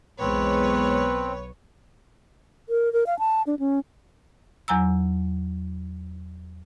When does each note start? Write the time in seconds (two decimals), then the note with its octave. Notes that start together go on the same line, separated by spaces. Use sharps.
0.20 B1 E2 G#3 B3 C4 B4 C#5
2.69 A#4
2.93 A#4
3.07 F5
3.19 A5
3.47 D4
3.59 C#4
4.68 E2 F#3 G#5 A#5 E6